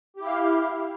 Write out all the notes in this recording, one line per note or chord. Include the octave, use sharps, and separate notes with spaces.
E4 G4 F5